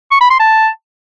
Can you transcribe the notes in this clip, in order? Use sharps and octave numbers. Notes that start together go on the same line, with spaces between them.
C#6
B5
C6
A5